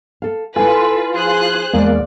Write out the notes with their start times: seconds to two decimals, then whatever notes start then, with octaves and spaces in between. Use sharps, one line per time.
0.22 A4 F5
0.56 E4 F4 A4 B4 G#5
1.15 F3 G#4 C5 F#6
1.73 E2 G#3 A#3 D5